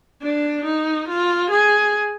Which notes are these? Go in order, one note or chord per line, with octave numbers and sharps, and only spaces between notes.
D4
D#4
F4
G#4